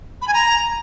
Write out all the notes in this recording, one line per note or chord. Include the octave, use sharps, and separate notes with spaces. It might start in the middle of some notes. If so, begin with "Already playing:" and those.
B5
G#5
A#5